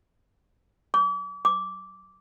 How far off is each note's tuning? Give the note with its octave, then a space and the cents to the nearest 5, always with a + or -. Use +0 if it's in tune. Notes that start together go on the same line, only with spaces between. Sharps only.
D6 -40
D6 -10